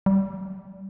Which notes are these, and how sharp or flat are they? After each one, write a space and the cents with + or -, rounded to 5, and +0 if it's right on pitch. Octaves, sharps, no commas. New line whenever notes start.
G3 -25